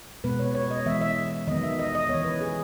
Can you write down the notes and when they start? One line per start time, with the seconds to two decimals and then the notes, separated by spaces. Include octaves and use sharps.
0.24 B2 G#3 B3 B4
0.39 C#5
0.55 C#5
0.71 D#5
0.86 E3 G#3 B3 E5
1.01 E5
1.47 D#3 F#3 B3 D#5
1.63 E5
1.79 D#5
1.95 D#5
2.09 E3 B3 C#5
2.25 B4
2.41 G#4